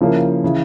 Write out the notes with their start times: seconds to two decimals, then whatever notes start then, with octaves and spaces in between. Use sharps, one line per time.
0.01 C#3 F3 A#3 C#4 E4
0.44 C#3 E3